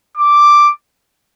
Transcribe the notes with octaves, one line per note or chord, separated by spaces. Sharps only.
D6